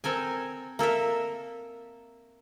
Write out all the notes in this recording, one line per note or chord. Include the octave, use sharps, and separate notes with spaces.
C4 A4 A#4 G#5
A#3 A4 A#4 E5